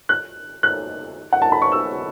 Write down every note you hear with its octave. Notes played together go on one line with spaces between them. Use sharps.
F#6
F#6
F#5
A5
B5
C#6
E6